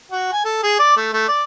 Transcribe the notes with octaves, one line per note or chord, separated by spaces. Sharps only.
F#4
G#5
A4
G#4
D5
A3
A3
D5